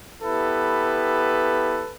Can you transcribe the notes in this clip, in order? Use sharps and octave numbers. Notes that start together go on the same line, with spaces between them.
B3 E4 G4 A4 B4